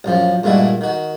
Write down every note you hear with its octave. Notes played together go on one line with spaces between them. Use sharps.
A1 F#2 F3
G2 A#2 G#3 A3 E4 F#4
D#3 F#4